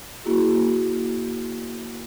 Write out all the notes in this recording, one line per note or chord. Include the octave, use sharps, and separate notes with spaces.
A#3 E4 F#4 G#4